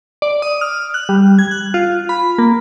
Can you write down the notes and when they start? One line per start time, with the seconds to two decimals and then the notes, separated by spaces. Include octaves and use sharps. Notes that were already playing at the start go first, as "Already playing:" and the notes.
0.22 D5
0.42 D#6
0.61 F6
0.94 F#6
1.09 G3
1.39 G#6
1.51 F#6
1.74 F4
2.09 B5
2.38 A#3